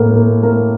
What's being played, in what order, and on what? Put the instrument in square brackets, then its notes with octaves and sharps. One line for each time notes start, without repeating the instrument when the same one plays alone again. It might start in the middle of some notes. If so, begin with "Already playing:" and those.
Already playing: [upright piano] A2 A#3
A#3
A#3